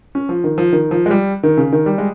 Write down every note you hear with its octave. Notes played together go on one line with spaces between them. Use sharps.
C#4
F3
D#3
F3
D#3
F3
G#3
G3
D#3
C#3
D#3
G3
G#3